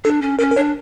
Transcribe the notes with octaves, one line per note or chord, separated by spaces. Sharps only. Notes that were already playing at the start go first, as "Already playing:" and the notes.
D4 A4
C#4
C#4 A#4
A#4
D4 C#5